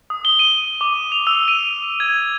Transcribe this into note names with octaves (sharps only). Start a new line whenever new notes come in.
D#6
G7
D#7
D6
F7
E6
D#7
G#6